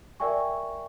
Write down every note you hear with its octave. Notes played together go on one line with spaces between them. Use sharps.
A#4 D5 E5 G5 G#5 C#6